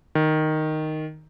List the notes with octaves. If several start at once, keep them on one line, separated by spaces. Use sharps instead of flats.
D#3